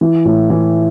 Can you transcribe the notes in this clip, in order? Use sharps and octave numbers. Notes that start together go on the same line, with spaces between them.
E3
A2
E3